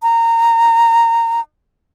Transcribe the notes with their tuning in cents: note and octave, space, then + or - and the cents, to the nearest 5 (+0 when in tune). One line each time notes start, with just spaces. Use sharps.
A#5 -20